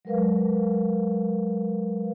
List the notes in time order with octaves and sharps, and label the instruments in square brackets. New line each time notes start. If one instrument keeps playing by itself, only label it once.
[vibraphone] F#3 G#3 A#4 B4 F5